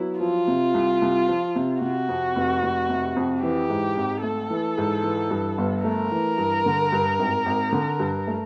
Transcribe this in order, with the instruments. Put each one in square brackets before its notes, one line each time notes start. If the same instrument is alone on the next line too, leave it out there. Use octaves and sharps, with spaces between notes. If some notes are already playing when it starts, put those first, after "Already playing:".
Already playing: [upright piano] F#3 B3 [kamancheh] E4
[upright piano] F3 [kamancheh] F4
[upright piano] C3
C2
C2
F3
C3
[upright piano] C3 [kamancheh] F#4
[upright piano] F2
F1
F1
C3
F2
[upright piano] E3 [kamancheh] G4
[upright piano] G#2
G#1
[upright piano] A3 [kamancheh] A4
[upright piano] E3
G#2
E3
G2
G1
[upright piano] A3 [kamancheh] A#4
[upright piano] E3
G2
D3
G2
G#1
G#1
D3
G2
A3